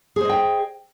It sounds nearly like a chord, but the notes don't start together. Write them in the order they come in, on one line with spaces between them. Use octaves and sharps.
G#4 C5 D#5 G5